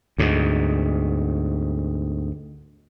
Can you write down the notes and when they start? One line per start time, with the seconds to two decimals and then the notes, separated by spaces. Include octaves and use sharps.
0.18 D2 G#2